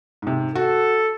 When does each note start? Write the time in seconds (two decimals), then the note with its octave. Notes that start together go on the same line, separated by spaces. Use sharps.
0.22 G#2 C3
0.55 F#4 A4